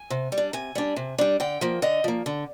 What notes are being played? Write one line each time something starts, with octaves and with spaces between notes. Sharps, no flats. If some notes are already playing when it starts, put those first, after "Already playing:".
Already playing: G#5
C3
G3
D4
C3 G#5
G3 D4
C3
G3 D4
D3 G5
F3 A#3
D3 D#5
F3 A#3
D3